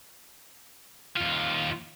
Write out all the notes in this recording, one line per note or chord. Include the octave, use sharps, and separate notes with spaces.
D#2 F4